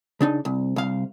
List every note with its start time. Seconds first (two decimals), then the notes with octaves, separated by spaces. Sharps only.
0.21 C#3 D4 D#4
0.45 C2
0.76 C2 F5